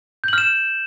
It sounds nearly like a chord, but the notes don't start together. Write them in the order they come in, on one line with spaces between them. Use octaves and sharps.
G6 F#7 F6 E7